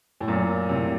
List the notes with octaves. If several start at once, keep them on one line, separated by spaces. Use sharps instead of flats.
A2
F#2 A#2
A2 C3